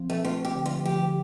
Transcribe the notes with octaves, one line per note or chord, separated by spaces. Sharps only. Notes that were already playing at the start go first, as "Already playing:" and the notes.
Already playing: F3 C4
A3
A3 F4
G4
D3
F4
F3 G4